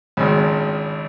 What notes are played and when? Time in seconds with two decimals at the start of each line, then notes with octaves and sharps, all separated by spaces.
0.17 G#1 C#2